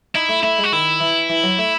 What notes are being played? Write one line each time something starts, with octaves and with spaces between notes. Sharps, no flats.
D#4 E4
A3
A3 E4
G#3
F#4
D#3 E4
E3
E3
F#3
A3